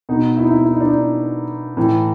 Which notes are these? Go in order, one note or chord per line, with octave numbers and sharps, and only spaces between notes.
B2 D#4
E4
D#4
E4
E4
D#4
D4
D#4
A2 E3